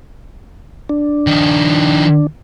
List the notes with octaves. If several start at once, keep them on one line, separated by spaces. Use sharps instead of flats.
D4
D#3 F3